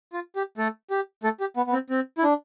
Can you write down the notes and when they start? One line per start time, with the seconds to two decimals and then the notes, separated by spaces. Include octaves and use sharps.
0.13 F4
0.36 G4
0.58 A3 A4
0.90 G4
1.24 A3 A4
1.40 G4
1.57 B3
1.67 B3
1.73 C4
1.90 C4
2.18 E4
2.23 D4